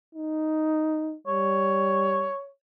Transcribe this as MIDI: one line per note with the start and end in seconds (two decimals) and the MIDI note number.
0.15 1.15 63
1.27 2.31 55
1.27 2.48 73